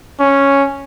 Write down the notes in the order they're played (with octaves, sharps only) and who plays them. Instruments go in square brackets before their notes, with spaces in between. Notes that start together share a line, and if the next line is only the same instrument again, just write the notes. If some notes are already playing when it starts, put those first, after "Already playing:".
[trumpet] C#4